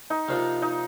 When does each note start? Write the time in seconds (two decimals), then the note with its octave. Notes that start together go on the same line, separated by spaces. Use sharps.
0.10 D#4
0.28 C3 F3 A#3 D4 F4
0.62 D#4